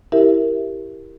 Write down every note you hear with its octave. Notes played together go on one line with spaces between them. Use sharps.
E4 G4 A#4 E5